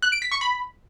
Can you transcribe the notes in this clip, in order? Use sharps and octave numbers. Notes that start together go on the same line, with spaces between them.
F#6
D7
B6
C#6
B5